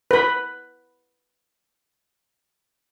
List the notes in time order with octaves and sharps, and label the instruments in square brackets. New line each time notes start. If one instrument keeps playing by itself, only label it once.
[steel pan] B4 B5